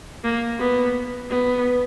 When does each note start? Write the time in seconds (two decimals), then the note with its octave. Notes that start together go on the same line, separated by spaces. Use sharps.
0.24 A#3
0.60 B3
1.30 B3